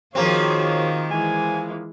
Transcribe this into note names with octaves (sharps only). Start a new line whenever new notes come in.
D#3 F3 A#3 C4 F4 F#4 G#4 C#5
E3 G#3 G#5